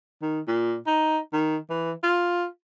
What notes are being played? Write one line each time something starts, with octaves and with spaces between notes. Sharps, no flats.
D#3
A#2
D#4
D#3
E3
F4